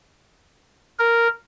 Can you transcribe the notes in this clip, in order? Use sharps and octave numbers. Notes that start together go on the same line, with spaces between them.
A#4